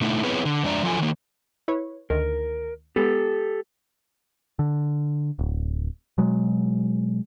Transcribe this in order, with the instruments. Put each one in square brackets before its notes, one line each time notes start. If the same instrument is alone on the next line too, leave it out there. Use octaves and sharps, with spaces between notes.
[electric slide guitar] B2 D3 A3 D#4 E4
B3 C4 E4 G#4 B4 C#5
D3
F2 G#3 D4 D5 E5 A#5
F3 F#3 D4 F4 A4 G#5
D#3 A#3
[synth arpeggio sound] E4 B4 C#5
[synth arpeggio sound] D2 D#3 [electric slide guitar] A#4
[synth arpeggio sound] G#3 B3 [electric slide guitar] G4 A4
[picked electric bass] D3
D1
B2 F#3 G#3